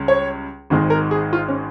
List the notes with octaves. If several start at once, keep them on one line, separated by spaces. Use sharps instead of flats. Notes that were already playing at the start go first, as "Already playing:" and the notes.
Already playing: C#2 C#3 G3
C#5
G#1 G#2 D#3 G#3
A#4
G#4
F4
C#4